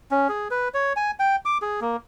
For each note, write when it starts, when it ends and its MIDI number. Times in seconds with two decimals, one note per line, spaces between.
0.11 0.28 61
0.29 0.48 68
0.51 0.69 71
0.74 0.93 73
0.96 1.11 80
1.19 1.36 79
1.45 1.58 86
1.62 1.80 68
1.81 1.97 58